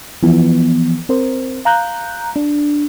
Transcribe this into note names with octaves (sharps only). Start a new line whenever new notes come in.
E3 F3 B3
C4 A#4 C5
F5 A#5 F#6 G6
D4